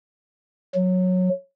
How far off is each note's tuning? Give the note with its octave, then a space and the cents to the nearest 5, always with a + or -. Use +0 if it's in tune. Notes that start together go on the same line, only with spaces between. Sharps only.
F#3 -15